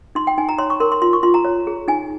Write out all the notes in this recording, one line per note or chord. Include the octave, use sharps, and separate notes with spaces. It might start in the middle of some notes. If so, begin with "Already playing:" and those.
D#4 C6
G5
D#4 G#5
A#5
C#5 C6
C#6
A#4 C6
C6
F4 C6
C#6
F4 C6
A#5
C#5
G#4
D#4 G#5